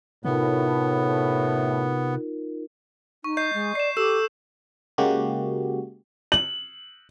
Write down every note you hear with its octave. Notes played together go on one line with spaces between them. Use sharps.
A2 C3 B3 D#4 F4 A#4
D#4 C#6
D#5 C#6 G6 C7
G#3
D5 C#6 C7 E7
G4 A4 E6 E7
C#3 G#3 A#3 F#4 G4
F#7